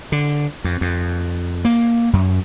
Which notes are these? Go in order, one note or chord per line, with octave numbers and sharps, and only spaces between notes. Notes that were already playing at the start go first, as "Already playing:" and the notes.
D3
F2
F2
A#3
F#2